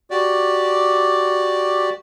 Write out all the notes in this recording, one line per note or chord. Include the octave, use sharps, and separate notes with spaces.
F#4 G4 D5